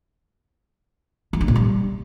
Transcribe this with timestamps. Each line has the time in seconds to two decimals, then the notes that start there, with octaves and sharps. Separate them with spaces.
1.33 F3
1.41 D4
1.48 A#2
1.56 G3